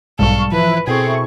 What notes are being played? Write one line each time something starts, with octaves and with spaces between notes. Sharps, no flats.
B1 G#2 G3 A4 F5 C#6
E3 F3 E4 B4 F#6
B2 C4 E4 G#4 A4 C#6